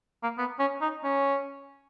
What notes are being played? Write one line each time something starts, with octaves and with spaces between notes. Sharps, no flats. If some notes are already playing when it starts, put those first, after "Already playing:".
A#3
B3
C#4
D#4
C#4